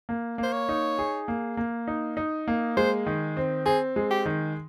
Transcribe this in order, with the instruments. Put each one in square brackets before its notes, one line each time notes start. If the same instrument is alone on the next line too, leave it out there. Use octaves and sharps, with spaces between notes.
[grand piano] A#3
[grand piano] A#3 [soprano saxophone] C5
[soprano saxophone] C#5
[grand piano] D#4
G#4
A#3
A#3
D#4
D#4
A#3
[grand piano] G#3 [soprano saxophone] C5
[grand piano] D#3
C4
[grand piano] C4 [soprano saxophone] G#4
[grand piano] G#3
[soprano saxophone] G4
[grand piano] D#3